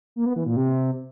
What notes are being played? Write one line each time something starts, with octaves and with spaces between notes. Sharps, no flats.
A#3
B3
E3
A#2
C3